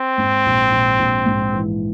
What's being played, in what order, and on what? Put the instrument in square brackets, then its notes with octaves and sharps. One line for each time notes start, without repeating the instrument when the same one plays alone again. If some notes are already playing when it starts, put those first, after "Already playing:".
Already playing: [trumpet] C4
[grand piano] G#2
A#1
A#1
A#1
G#2
E3